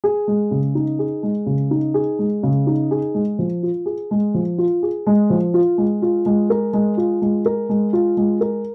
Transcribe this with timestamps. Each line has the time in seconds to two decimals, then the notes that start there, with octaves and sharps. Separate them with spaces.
0.04 G#4
0.27 G#3
0.51 C#3
0.75 D#4
0.99 G#4
1.23 G#3
1.46 C#3
1.71 D#4
1.94 G#4
2.19 G#3
2.43 C#3
2.67 D#4
2.91 G#4
3.14 G#3
3.39 F3
3.63 F4
3.86 G#4
4.11 G#3
4.34 F3
4.58 F4
4.83 G#4
5.07 G#3
5.30 F3
5.54 F4
5.78 G#3
6.02 F4
6.26 G#3
6.50 A#4
6.73 G#3
6.97 F4
7.22 G#3
7.46 A#4
7.69 G#3
7.93 F4
8.17 G#3
8.41 A#4